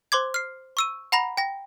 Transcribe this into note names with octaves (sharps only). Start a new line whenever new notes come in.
C5 C6 D6 G#6
F6 C7
C#6 E6 D#7
F#5 A#5 B5 A#6 F7
G5 A#6